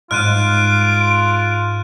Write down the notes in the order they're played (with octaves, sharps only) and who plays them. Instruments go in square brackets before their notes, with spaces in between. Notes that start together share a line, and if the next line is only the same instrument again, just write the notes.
[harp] G#2 [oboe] F4 [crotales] F6 F#6 D#7 [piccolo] D7